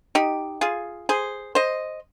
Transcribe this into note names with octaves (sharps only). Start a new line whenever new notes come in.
D#4 G4
F4 G#4
G#4 C5
C5 D#5